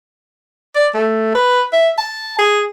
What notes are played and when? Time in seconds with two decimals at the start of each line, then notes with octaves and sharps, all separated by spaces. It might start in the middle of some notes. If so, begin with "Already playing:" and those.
0.75 D5
0.94 A3
1.35 B4
1.73 E5
1.98 A5
2.38 G#4